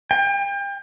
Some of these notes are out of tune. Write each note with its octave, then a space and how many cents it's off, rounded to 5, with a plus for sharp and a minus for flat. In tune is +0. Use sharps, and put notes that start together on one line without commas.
G5 +35